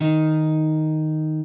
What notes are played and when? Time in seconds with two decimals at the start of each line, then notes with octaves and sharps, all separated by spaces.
0.01 D#3 D#4